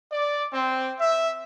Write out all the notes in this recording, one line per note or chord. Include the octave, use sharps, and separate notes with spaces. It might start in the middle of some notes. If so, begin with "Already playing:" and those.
D5
C4
E5